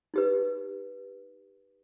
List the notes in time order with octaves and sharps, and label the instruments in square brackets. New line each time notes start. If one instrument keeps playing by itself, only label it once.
[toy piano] D#4 G4 B4